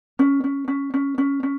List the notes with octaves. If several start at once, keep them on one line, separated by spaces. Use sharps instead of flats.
C#4
C#4
C#4
C#4
C#4
C#4